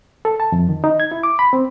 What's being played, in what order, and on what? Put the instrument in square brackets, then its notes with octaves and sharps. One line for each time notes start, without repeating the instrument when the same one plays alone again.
[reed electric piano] A4
A5
F2
D#3
D#4
G#6
E4
D6
B5
C4